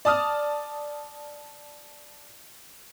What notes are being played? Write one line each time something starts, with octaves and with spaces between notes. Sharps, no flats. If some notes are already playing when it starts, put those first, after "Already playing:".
D5 A5 D#6 F6